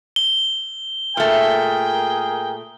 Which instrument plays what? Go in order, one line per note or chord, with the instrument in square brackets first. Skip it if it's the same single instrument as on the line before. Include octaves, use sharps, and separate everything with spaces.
[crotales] G7
[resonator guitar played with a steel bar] A#2 A3 [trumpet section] G#4 A#4 G5